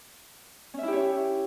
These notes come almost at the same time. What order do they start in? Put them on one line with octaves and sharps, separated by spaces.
C#4 E5 E4 G4 C#5